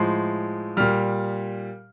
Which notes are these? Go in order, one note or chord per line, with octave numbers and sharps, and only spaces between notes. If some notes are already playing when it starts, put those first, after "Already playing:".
Already playing: A2 F3 G#3 C6
A#2 G3 F6